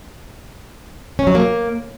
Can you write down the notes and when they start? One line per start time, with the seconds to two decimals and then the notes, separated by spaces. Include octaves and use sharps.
1.19 C#4
1.27 F#3
1.35 A#3